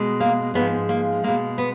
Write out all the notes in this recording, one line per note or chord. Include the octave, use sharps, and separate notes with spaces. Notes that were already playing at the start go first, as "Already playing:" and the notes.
Already playing: B2 G#3
A#3
G#2 F3 G#3 B3
A#3
B2 G#3 A#3
B3